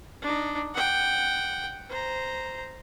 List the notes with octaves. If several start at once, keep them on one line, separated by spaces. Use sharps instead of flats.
D4 D#4
F#5 G5
C5 A#5